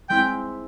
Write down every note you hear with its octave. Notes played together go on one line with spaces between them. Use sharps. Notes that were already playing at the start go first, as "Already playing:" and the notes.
G#3 C4 E4 G5